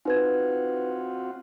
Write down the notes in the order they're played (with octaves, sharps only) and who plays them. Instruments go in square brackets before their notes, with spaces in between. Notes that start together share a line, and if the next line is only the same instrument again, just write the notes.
[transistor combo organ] C4 F4 F#4 [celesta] D#4 B4 G#6